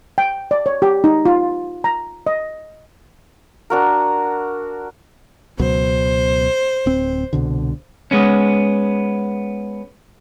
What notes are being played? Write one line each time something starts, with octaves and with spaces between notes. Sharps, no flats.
G5
D5
C#5
G4
D#4
F4
A#5
D#5
D4 F#4 A#4
C#2 B2 F#3 C5
D1 C4
C2 B2 D3
G#3 B3 C#4